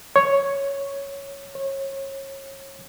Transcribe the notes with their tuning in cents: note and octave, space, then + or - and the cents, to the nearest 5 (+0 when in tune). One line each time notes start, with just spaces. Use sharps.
C#5 +0
C#5 -30